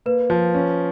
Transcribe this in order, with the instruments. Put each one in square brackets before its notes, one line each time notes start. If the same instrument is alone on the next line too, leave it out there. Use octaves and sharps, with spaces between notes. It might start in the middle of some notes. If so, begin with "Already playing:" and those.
[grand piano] A#3 [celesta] B4
[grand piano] F3
C#4